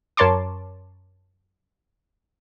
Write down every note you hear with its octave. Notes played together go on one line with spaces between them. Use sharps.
F#2 A#4 C#5 A5 C6 D6